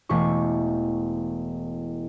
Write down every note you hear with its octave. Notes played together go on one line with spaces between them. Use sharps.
E1 A3 G4 C#6